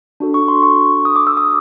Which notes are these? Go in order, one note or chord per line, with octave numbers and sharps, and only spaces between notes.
D4 F#4 A4
C#6
C6
C#6
D#6
D6
E6
D#6